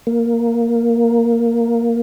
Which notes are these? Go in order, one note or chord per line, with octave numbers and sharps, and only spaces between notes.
A#3